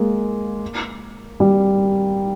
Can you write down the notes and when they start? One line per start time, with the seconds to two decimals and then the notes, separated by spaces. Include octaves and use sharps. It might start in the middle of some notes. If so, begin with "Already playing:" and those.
Already playing: G#3 A#3
1.40 G3